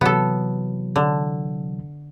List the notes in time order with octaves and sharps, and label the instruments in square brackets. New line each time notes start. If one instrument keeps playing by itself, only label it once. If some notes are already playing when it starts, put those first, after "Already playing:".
[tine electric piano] C3 E3 F#3 [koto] B3 A4
[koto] D3